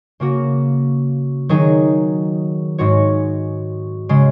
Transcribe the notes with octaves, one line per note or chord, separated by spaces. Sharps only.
C#3 A#3 F#4
D#3 F#3 D#4 G#4
G#2 G#3 F#4 C#5
C#3 G#3